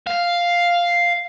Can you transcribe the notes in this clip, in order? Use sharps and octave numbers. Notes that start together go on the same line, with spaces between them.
F5